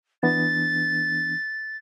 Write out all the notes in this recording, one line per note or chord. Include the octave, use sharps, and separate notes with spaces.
E3 B3 D4 A6